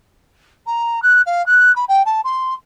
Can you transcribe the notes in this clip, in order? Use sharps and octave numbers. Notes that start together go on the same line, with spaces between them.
A#5
F#6
F5
F#6
B5
G5
A5
C6